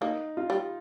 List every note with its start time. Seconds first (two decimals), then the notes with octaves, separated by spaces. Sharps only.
0.01 A#3 D#4
0.37 F4
0.50 G3